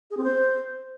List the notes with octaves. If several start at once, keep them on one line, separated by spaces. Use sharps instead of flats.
G#4
C4
C5